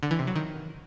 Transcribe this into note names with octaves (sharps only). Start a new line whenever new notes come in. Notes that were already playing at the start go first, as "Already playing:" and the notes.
D3
E3
C3
F#3
D#3